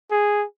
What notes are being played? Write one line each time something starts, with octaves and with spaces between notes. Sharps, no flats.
G#4